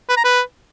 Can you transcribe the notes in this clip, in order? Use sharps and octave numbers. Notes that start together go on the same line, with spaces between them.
B4
A#5
B4